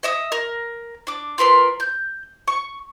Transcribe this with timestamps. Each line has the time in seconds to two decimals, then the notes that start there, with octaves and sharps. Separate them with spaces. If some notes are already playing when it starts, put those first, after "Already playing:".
0.03 D#5 E5 D#6
0.32 A#4
1.07 D4 D6
1.38 F4 A#4 B4 C6
1.80 G6
2.48 C#6